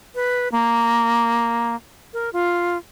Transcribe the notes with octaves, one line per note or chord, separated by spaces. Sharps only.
B4
A#3
A#4
F4